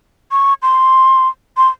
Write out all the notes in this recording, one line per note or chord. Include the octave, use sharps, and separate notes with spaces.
C#6
C6
C6